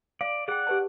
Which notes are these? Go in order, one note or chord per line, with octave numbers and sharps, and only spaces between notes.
D5 F5
G#4 D5 F#5 G5
G4 B4 A5